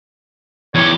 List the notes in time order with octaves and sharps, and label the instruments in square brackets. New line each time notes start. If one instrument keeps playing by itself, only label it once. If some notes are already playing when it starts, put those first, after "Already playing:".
[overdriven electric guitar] E2 G4 [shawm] C#5